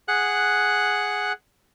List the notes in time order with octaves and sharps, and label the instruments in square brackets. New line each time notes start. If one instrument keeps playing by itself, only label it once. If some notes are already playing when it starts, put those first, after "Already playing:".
[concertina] G#4 F#5 F#6